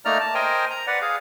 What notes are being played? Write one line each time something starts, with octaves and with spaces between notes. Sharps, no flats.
A3 A#3 D#4 D5 A#5 F6
A5
A#4 C5 D#5 G5 G#5
A#5
B4 D5 F#5
G#4 F5